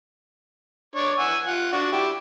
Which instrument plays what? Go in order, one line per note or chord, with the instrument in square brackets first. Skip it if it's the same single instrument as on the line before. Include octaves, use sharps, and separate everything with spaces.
[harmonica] D4 C#5 D5
F#5 G#5 E6
F4 F#5
D4 F#4
E4 G4